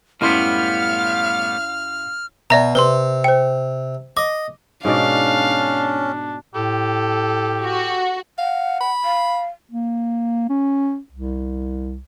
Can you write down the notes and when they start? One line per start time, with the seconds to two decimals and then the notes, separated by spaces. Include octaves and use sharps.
0.21 F#2 A2 G3 B3 E4 F5 C6 F6
2.50 B2 D5 E5 A#5
2.75 C3 B4 C6
3.24 C5 G5
4.17 D#5 D6
4.85 G#2 B2 C#4 D4 D5 F5
6.54 A2 G4 A4
7.63 F#4
8.39 F5 F#5
8.80 B5
9.04 F5
9.71 A#3
10.50 C#4
11.12 C2